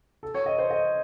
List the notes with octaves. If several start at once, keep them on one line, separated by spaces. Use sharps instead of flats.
A4
C#5
D#5
C5
D#5